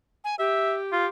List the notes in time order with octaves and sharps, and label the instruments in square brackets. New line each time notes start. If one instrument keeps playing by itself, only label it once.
[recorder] G#5
[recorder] G4 [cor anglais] E5
[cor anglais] F4